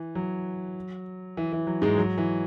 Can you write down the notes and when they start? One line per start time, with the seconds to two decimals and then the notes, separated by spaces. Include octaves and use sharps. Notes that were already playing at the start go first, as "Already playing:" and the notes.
Already playing: E3
0.15 F#3
1.37 E3
1.53 E3
1.67 F#3
1.82 G#2 G#3
1.98 F#3
2.18 E3